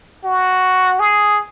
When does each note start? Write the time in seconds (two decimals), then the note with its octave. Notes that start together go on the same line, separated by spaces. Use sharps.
0.24 F#4
1.00 G#4